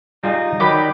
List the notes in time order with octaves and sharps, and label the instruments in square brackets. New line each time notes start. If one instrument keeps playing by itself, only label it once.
[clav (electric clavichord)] G3 F4 G#4 [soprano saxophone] D#4
[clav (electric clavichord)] D#3 F#3 [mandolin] G4 D5 B5